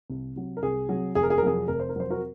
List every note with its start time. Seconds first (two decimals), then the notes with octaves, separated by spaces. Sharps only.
0.10 C2
0.36 C3 F#3
0.57 A#4
0.63 C2 G#4
0.89 C3 F#3
1.15 F1 G#4
1.23 A#4
1.30 G#4
1.38 A#4
1.42 F2 C3 F#3 G#4
1.68 F1 A#4
1.80 C5
1.89 A#4
1.96 F2 C3 F#3 C5
2.10 F#4 A#4